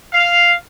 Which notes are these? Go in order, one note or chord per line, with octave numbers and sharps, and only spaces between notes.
F5